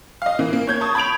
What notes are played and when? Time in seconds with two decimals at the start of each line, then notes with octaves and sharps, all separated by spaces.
0.22 D#5 F5
0.39 E3 A#3
0.53 A#3
0.67 C#5 G6 G#6
0.81 A5 C#6 D#6 G#6
0.95 B5 G#6 D7 F7